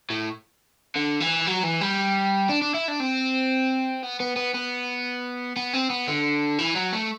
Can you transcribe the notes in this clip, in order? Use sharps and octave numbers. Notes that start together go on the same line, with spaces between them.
A2
D3
E3
F#3
E3
G3
D4
D4
E4
D4
C4
B3
B3
B3
B3
B3
C4
B3
D3
E3
F#3
A3